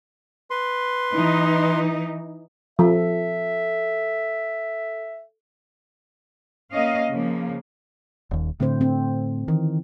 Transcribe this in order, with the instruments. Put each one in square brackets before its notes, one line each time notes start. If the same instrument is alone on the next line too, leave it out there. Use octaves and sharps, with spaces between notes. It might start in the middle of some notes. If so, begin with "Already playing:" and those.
[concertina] B4 C6
[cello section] E3 D#4
[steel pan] F3 [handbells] A4 [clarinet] E5
[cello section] A#3 C#4 D#5 F5
C#3 F3 A#3
[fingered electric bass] D#1 D#2
[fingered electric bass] A2 [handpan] D3 C4 C5
[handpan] C4
[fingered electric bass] D#3 [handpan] E3